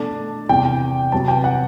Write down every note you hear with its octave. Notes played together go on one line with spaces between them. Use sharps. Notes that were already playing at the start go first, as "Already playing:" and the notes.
Already playing: B2 A3 D4 A5
E2 C3 E3 G5
C3 F#3 B3 A5
G5
F#5